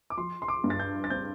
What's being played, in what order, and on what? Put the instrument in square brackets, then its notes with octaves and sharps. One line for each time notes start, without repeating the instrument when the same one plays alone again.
[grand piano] D6
[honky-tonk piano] F3 [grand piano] C6
[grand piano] C6
D6
[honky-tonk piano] G2
[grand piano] A6
G6
A6
[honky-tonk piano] C4 [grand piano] G6